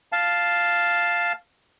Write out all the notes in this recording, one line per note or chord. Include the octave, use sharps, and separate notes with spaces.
F5 A5